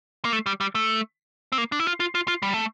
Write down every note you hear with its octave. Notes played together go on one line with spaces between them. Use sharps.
A#3
A3
G3
G3
A3
C4
A#3
D4
E4
F4
F4
F4
F4
G3
A3